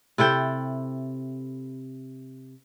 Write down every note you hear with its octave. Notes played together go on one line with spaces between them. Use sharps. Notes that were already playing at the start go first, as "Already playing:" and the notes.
C3 E4 A4 G5